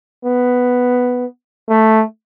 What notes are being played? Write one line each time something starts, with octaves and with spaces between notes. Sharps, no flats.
B3
A3